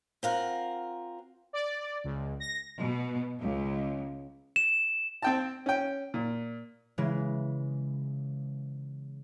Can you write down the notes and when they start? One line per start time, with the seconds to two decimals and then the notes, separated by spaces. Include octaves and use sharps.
0.23 C4 F4 A#4 F#5
1.53 D5
2.04 C#2
2.40 A#6
2.79 B2
3.40 C#2
4.56 E7
5.22 C4 G5 A5
5.66 C#4 G5
6.14 A#2
6.98 C#3 E3 G#3